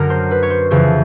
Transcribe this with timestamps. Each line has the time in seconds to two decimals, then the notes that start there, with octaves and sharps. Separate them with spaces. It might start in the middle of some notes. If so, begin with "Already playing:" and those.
Already playing: F#2 D3 A#4
0.10 C5
0.31 B4
0.43 C#5
0.50 C5
0.71 F2 C#3 E3 C5